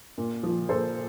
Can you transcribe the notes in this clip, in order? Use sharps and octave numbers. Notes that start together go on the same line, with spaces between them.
A#2
F3
A#2 A4 C5